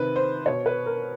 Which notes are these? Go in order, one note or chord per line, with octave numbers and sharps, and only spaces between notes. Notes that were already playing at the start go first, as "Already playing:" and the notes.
Already playing: C3 D#3 B4
C5
B2 C#5
B4
A#4